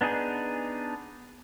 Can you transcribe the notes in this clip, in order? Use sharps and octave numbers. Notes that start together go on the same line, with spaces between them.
B3 D4 D#4 G#4